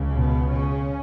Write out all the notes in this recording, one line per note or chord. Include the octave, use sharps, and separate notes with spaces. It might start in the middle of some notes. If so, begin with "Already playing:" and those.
Already playing: C#2 C#3
B2 B3
C#3 C#4